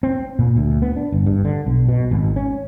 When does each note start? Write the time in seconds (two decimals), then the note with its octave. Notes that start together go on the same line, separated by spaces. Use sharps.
0.03 C4
0.39 A#2
0.57 D2
0.82 B3
0.96 D4
1.12 G1
1.26 G2
1.45 D3
1.66 B1
1.89 B2
2.11 G#1
2.36 C#4